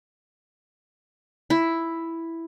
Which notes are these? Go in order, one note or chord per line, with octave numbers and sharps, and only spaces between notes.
E4